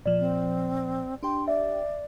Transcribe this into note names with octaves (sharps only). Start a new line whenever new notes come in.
A#2 F3 D5
C4
D4 G4 G5 C6
D5 E5